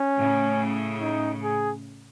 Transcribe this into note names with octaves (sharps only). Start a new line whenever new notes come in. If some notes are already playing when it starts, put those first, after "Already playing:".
Already playing: C#4
A2 C#3
D#4
G#4